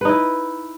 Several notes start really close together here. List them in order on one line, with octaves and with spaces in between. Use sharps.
B4 D#4 E4